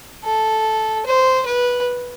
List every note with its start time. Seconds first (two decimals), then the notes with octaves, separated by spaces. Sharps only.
0.24 A4
1.06 C5
1.46 B4